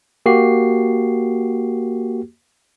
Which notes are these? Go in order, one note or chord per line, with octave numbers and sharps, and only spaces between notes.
A#3 F#4 G4 C7